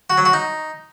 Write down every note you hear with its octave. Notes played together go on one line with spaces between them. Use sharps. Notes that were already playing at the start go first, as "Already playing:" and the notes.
F#4
F#3
F#4
D#4